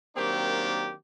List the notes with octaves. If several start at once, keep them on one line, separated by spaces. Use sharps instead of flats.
D#3 F#3 A#3 C4 D4 G4